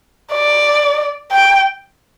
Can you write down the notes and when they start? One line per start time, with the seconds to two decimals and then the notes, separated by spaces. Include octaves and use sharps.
0.33 D5
1.31 G5